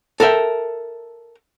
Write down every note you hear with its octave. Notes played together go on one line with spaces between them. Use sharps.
A4 A#4 E5 G5